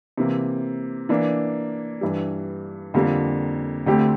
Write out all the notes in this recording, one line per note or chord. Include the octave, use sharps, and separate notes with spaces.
C3 E3 A#3
E3 A#3 D4
G2 E3 G3
F2 D3 G3 A#3
D2 D3 A3 C4 G4